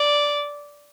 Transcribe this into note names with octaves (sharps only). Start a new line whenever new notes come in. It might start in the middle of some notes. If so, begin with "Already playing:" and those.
Already playing: D5